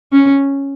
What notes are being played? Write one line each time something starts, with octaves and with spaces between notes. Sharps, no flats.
C#4